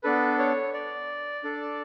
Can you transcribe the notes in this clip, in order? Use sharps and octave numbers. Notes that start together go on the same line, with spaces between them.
B3 D4 A4 B4
C#5
D5
D4 A4